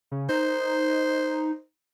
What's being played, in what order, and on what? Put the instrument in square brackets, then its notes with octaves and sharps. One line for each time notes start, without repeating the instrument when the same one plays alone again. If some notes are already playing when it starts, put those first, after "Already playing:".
[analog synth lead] C#3
[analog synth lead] D#4 [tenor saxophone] C5